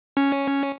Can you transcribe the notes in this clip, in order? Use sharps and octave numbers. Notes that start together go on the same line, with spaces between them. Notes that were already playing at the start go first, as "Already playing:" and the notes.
C#4